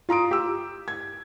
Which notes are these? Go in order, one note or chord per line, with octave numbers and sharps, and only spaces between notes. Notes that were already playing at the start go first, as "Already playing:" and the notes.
F4 A#5 D#6 D7
G4 E6
G#6